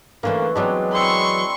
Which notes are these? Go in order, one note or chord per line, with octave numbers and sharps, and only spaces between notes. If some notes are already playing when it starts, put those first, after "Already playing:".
D3 E3 A3 A#3 C#4
E3 F#3 G#3 B3 C4 D4
C4 E4 B4 C6 C#6